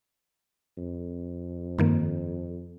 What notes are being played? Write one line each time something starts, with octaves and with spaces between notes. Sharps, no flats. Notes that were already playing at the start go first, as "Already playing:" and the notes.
F2
G2 D#3 A#3